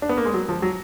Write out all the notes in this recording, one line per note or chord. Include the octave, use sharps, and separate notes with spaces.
D4
B3
A#3
G#3
F#3
F3
F#3